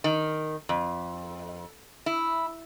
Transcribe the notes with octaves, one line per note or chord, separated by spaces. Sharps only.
D#3
F2
E4